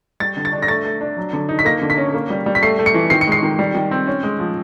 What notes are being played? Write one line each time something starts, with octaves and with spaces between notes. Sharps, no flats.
G3 A6
D3
A6
D4
A#6
A3 A6
A3
D4
F#3
D3
D#4
B6
A#3 A#6
D3
B6
C#4
A#3
G3
G3
B6
A3 C7
A3
C#7
E3
D#3 C7
C#7
G#3 C7
D#3
G3
D#3
C4
C#4
G#3
F3